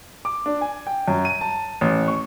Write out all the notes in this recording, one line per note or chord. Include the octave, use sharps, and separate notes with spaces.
D6
D4
G#5
G5
F#2
D#7
A5
A1
C#6